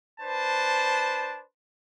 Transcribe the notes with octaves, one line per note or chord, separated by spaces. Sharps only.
D4 B4 C5 A5